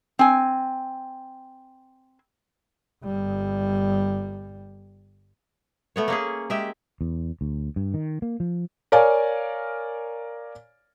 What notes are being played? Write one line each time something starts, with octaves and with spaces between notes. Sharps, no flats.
C4 G#5
G1 G3
A3 B3 C#5
A#3 C#4 G#4
G#3 G4 E5
E2
D2
G2
D#3
A#3
F3
A#4 C#5 D5 F5 G#5